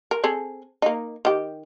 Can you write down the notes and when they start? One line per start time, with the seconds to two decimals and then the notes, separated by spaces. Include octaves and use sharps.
0.11 A#4
0.23 C4 G#4 A4
0.82 A#3 D#4
1.25 D#3 G4